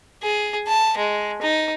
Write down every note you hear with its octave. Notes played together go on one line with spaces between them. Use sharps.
G#4
A5
G#3
D#4